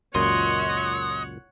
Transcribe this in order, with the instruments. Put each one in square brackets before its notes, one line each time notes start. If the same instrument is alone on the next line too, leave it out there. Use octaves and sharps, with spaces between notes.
[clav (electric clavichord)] C#2 F#2 A#2 [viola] C#5 F#5 [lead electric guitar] D#5 [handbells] C6